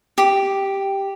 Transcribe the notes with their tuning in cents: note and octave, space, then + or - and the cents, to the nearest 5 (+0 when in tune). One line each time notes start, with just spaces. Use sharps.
G4 +0